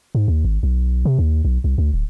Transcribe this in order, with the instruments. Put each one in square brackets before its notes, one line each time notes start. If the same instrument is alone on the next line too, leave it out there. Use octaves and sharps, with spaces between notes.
[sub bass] G#2
D#2
G#1
B1
C3
D#2
B1
C2
D2
D1